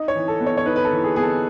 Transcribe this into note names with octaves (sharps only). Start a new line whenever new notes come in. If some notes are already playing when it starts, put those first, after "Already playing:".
Already playing: D#4 D#5
C#5
E3
A4
B3
C#5
C#5
D#4 B4
B4
A4
E3
G#4
B3 G#4
A4